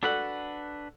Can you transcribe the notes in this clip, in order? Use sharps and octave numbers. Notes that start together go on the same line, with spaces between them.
D4 F#4 A4 B4 D5 F#5